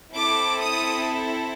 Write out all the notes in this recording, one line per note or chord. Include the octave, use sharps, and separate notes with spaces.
C4 E4 A4 D6
D#6